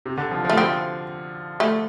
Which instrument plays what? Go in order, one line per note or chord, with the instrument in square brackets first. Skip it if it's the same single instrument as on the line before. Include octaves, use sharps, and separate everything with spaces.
[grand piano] C3
D3
F3
F3
[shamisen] A3
[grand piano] F3 [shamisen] C4
[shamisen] A3